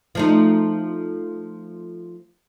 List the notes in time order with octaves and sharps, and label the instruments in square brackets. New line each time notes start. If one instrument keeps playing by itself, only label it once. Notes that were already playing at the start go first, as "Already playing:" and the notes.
[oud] F3 A3 D#4